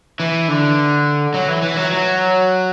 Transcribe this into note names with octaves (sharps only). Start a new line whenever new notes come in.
E3
D3
F#3
E3
E3
F#3
F#3